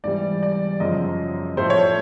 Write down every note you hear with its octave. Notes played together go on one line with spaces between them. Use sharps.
G#2 E3 G3 D5
D5
F#2 C#3 F3 D#5
A2 F3 A3 C5
C#5